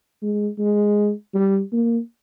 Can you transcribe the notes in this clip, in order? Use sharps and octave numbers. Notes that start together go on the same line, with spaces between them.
G#3
G#3
G3
A#3